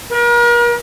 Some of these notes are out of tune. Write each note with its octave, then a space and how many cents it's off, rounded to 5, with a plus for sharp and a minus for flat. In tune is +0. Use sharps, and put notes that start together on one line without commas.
A#4 +40